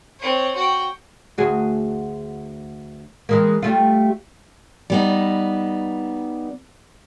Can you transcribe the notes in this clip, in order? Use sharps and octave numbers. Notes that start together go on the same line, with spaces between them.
C4 C#5
F#4 G5
D2 F#4 G#4
E3 G#3 A#3
G3 A3 F4
G3 B3 D#4